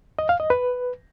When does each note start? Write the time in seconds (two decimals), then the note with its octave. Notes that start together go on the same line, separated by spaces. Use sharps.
0.19 D#5
0.29 F5
0.40 D#5
0.50 B4